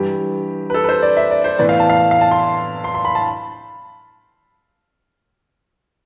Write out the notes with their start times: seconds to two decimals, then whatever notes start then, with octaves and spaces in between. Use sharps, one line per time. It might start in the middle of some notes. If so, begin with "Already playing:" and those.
Already playing: G2 E3 G3 G4
0.70 B4
0.74 A4
0.84 B4
0.89 C5
1.02 D5
1.17 E5
1.31 D5
1.44 C5
1.58 A2 E3 B3 D5
1.69 F5
1.80 A5
1.89 F5
2.11 F5
2.21 A5
2.31 C6
2.84 C6
2.94 C6
3.05 B5
3.15 A5